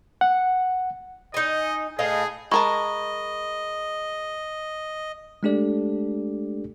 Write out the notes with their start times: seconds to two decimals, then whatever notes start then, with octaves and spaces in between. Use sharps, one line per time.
0.21 F#5
1.34 D#4 D#5 G#5
1.99 A2 G#4 D#5 F5
2.52 G#3 A#4 D#5 A5 B5 C#6
5.43 G#3 A3 D4 G4 A4 D5